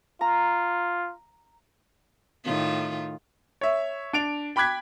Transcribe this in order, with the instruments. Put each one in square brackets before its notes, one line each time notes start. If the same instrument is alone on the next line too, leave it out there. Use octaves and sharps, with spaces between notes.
[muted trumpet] F4 [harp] A#5
[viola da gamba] A2 D#3 F4
[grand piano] C#5 E5
D4 D7 F7
G5 B5 D6 F#6 G#6 B6